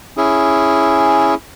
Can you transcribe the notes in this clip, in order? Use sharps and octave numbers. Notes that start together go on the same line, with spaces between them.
C#4 E4 G#4